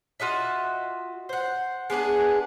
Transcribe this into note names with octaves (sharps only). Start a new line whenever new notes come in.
F4 F#4 D#5 E5
C5 F#5
G#3 B3 D4 G#4